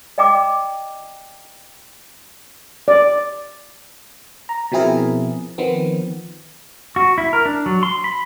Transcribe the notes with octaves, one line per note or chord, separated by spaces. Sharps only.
D5 D#5 G5 A#5 D6
D5
A#5
B2 F3 C4 E4 G#4 A#4
D#3 F3 B3 C4
F#4
E4
A#4
D4
F#3
C6
B5